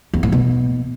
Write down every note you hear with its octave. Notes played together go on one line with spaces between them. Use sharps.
E2
A2
B2